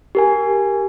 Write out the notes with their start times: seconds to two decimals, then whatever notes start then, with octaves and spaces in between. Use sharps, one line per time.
0.15 G4 A#4 G#5